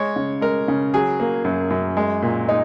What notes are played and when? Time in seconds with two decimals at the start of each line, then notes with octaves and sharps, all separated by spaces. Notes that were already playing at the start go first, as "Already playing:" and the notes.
Already playing: G#3 C#5
0.16 C#3
0.41 G#3 A#4
0.68 C#3
0.94 F#3 G#4
1.20 A#3
1.45 F#2
1.70 F#2
1.97 G#3
2.22 A#2
2.48 G#3 D#4